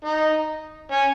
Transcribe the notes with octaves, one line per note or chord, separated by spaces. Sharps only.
D#4
C#4